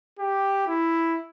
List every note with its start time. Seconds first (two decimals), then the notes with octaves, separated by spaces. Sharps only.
0.19 G4
0.67 E4